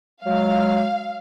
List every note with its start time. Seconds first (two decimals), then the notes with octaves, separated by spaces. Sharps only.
0.24 F#3 G#3 F5